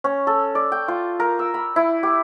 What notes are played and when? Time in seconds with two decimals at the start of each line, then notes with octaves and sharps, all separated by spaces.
0.04 C#4
0.27 A4
0.55 D5
0.72 G5
0.88 F4
1.20 A#4
1.39 E6
1.54 B5
1.76 E4
2.03 G4